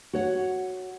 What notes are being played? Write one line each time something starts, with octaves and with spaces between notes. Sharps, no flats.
F#4 C#5 F#5